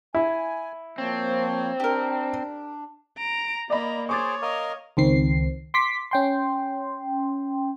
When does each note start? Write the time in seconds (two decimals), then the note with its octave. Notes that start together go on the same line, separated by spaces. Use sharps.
0.15 E4 G#5
0.98 F3 A#3 C4 C#5
1.80 D4 G4 A#4
3.18 A#5 D7
3.70 A#3 D5 D#5 A#5 B5
4.09 G#4 C5 C#5 C#6 D6 A6
4.42 A#4 D#5 F5
4.97 C#2 D#3 C4 C7
5.74 C6 D6 B6
6.11 C#4 G5 C6